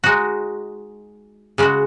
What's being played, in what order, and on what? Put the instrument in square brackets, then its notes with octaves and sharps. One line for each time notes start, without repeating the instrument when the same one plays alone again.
[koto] G#3 D#4 F#4
C#3 G#3 C#4 F#4